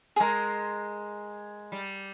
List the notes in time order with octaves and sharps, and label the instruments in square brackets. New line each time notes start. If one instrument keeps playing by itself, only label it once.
[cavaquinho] G#4
[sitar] G#3 [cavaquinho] A#4
[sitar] G3